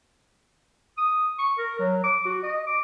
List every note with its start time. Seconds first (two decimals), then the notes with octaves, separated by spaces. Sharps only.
0.97 D#6
1.39 C#6
1.58 A#4
1.79 F#3
2.04 D6
2.25 F#4
2.43 D#5
2.66 D6